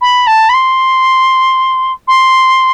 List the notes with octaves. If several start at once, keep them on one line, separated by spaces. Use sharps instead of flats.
B5
A5
B5
C6
C6